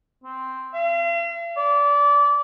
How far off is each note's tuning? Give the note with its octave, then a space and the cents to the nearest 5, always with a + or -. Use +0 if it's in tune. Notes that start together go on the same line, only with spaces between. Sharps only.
C4 +0
F5 -45
D5 -25